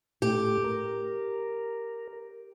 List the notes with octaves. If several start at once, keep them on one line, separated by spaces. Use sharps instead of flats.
A2 A3 G4
A#4